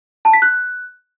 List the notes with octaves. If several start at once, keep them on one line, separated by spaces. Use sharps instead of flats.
A5
B6
F#6